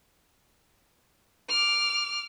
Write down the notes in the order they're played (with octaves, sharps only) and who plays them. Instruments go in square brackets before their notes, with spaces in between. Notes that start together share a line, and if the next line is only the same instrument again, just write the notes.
[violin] D6 F6